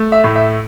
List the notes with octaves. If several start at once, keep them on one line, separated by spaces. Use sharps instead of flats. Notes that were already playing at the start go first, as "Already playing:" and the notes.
Already playing: A3
E5
A2
E5